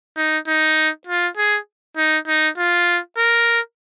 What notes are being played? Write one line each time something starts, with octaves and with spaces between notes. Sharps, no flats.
D#4
D#4
F4
G#4
D#4
D#4
F4
A#4